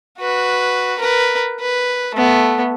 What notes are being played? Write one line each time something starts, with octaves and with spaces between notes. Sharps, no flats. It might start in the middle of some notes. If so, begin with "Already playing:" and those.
F#4 B4
A#4 B4
B4
A3 B3